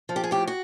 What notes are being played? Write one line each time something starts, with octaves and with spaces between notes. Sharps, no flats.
F3
G4
G#4
A2 G4
F#4